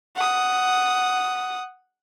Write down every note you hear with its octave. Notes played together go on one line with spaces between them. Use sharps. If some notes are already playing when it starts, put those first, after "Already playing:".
F#5 D#6